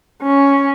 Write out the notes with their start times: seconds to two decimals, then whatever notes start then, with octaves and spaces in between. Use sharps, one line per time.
0.22 C#4